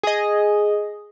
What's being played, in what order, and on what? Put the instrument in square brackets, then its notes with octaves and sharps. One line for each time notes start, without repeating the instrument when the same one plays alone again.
[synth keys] G#4 D#5